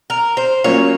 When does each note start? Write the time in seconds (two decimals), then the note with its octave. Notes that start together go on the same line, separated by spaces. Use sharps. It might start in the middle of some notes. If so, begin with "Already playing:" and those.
0.10 A#4
0.37 C5
0.64 F#3 A#3 C#4 F4 C#5